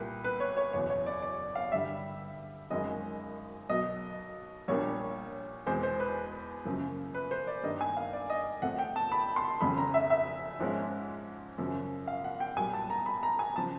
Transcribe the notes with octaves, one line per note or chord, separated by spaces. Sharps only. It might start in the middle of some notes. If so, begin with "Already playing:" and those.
Already playing: C2 A#2 G3 A#3 B4
B4
C#5
C#5
F#1 E2 B2 C#5
C#5
D5
D5
F5
G2 D3 G3 E5
G#1 F#2 D#3 G#3 D#5
B1 B2 F#3 D#5
A#1 A#2 G3 A#3 D4 C#5
E2 B2 G#3 C4 C5
C5
B4
F#2 C#3 F3 A#3
B4
C5
D5
G2 D#3 G3 A#3 D4 D#5
G#5
F5
D5
D#5
F2 C3 F3 A3 F#5
G5
A5
B5
C6
F1 F2 C#3 B5
A#5
E5
E5
G#2 F3 G#3 C#4
F#2 C#3 F3
F5
F#5
G5
B1 A#2 G3 G#5
A5
A#5
B5
A#5
G#5
C#3 F3 A5